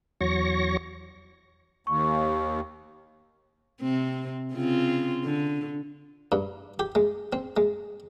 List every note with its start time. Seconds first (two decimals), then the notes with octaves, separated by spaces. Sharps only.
0.21 E2 F#3 C#5 C#6 A#6
1.87 D#2 C#6
3.82 C3 C4
4.53 C#3 C4 F4
5.24 D3
6.32 G2
6.79 G4
6.95 G#3
7.33 C4
7.57 G#3